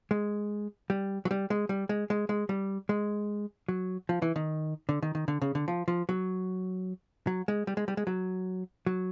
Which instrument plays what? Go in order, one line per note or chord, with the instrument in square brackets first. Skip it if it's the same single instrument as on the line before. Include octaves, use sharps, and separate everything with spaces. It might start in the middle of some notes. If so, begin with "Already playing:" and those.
[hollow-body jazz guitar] G#3
G3
F#3
G3
G#3
G3
G#3
G#3
G#3
G3
G#3
F#3
F3
E3
D#3
D3
D#3
D#3
D3
C#3
D3
F3
F3
F#3
F#3
G#3
G3
G#3
G3
G#3
F#3
F#3